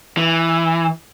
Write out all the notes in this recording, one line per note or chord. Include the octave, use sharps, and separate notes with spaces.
E3